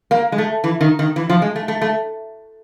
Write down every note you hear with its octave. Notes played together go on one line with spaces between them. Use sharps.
A#3
G#3
A3
E3
D#3
D#3
E3
F3
G#3
A3
A3
A3